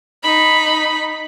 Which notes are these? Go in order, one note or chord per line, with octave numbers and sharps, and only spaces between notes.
D#4 B5